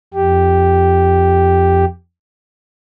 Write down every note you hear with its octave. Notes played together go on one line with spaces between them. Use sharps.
F2 G4